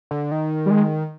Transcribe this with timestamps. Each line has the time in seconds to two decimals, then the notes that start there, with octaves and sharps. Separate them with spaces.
0.11 D3
0.32 D#3
0.66 G3
0.71 G#3